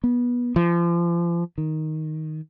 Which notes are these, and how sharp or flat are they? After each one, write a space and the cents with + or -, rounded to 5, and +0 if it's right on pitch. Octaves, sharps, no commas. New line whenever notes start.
B3 -20
F3 -35
D#3 +5